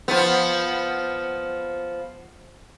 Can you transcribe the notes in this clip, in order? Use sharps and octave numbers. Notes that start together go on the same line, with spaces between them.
F3 B3